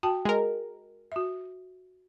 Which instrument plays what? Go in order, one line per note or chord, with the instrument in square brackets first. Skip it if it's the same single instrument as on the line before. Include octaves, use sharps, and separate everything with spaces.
[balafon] F#4 G5 A5
[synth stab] G#3 A#4
[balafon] F#4 E5